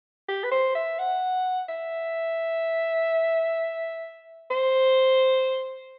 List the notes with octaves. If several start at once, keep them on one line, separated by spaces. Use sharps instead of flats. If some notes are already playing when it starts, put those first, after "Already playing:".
G4
B4
C5
E5
F#5
E5
C5